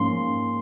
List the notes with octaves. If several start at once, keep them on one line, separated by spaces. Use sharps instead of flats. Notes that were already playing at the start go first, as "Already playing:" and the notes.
Already playing: G#2 F3 A#3 C#4 C6